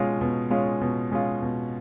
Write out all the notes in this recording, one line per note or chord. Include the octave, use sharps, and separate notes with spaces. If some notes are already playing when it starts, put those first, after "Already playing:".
Already playing: B2 G#3 C#4 F4
B2
G#3 C#4 F4
B2
G#3 C#4 F4
B2